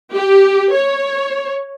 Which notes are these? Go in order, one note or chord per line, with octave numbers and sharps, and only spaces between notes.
G4
C#5